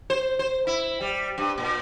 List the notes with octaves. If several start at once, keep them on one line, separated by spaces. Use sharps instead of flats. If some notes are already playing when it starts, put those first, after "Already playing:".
C5
C5
E4
G3
G2
A#2